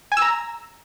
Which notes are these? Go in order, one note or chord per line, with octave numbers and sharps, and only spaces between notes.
G#5
E6
A#5